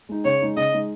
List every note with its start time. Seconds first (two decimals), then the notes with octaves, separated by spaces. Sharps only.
0.09 G#3 D#4
0.24 C#3 C#5
0.42 G#3 D#4
0.57 C#3 D#5
0.73 G#3 D#4